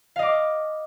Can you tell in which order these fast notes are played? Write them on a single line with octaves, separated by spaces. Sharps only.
F5 D#5 D6